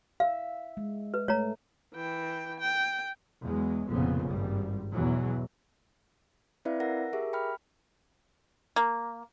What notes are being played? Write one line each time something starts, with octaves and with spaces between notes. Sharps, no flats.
E5 F5
G#3
B4
A3 C#5 A#5
E3 G5
G5
E2 F#3 G#3
F1 F2 A#2 C#3 B3
G#1 G2 G3
E2 B2 E3 F#3
C4 E4 B4 D5 E5 F5
A#4 F#5 A#6
G4 G#4 A#4 E5
G5 B5 F6
A#3